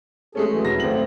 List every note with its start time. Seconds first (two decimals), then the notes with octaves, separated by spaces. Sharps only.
0.35 G#3 A3 C#4 G#4 A4
0.50 E3 F#3
0.64 E1 F#4 A#6
0.80 G#1 A3 C4 F#7